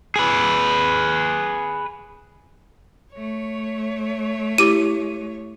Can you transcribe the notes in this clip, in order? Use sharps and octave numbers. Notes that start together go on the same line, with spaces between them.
G#4 B4
A3 C#5
E4 G4 D6 D#7